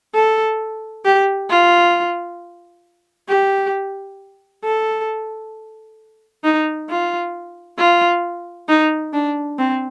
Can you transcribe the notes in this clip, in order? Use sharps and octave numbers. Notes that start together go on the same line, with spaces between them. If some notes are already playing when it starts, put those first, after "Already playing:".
A4
G4
F4
G4
A4
D#4
F4
F4
D#4
D4
C4